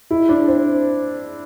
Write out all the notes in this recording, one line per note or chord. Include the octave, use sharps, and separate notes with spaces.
E4
D4
C4